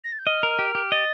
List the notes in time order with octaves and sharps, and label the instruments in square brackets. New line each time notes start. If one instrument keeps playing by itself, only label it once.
[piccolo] A#6
A6
G6
[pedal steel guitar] D#5 [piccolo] F6
[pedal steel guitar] A#4
G4
G4
[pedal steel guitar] D#5 [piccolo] A6